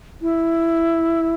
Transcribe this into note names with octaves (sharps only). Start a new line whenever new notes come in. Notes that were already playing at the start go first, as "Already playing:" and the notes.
E4